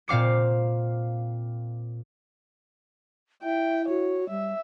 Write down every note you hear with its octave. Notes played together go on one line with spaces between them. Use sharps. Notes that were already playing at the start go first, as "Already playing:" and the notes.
A#2 C4 F5 D6 C#7
E4 E5 G5
F#4 C#5
G3 E5